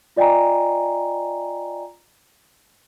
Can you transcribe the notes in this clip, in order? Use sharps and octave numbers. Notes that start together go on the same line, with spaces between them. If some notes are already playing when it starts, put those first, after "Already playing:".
F4 D5 D#5 G5 G#5 A#5